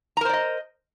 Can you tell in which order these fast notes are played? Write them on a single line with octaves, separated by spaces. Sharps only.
A#5 A#4 C5 D5 D#5